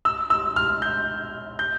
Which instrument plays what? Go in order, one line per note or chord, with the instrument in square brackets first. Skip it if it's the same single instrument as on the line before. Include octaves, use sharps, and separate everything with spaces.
[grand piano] E6
E6
F6
G6
G6